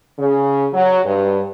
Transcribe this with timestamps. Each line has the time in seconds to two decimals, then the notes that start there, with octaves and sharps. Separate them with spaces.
0.19 C#3
0.73 F#3
1.04 G2